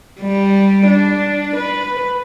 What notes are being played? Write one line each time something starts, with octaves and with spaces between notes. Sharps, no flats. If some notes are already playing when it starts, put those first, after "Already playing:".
G3
D4
B4